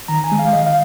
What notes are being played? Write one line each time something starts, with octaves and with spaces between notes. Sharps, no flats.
D#3 A#5
G#5
G#3
F5
D#3 D#5
F5